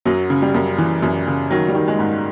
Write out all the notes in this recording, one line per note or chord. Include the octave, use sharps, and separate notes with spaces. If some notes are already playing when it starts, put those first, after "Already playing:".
F#2 F#3
C#3
G3
F#2
E3
F#2
C#3
D#3 F#3
G3
D#3
G#3
G#2